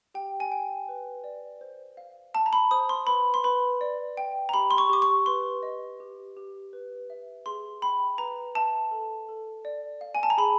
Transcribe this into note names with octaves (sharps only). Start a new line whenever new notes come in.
G4 G5
G#5
G5
B4
D5
C5
F5
F5 A5
A#5
B5
C5 D#6
C6
B4 B5
C6
B4 B5
D5
G5
A#5
G4 B5
C6
C#6
G4 D6
C#6
B4 C6
D#5
G4
G4
B4
E5
G#4 C6
G5 B5
B4 A#5
E5 A5
A4
A4
D5
F5
G#5
A5
A#5
G#4 B5